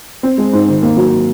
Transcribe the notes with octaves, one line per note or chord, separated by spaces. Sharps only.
C4
G#3
G#2
D#3
A#3
F#3